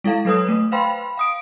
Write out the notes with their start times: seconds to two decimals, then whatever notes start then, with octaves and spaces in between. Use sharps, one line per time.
0.04 G#3 E4 A4 F5
0.25 F#3 A4 B4 C#5 D#6
0.48 A3
0.72 B4 C5 F5 G5 B5 C6
1.17 F5 D#6 D7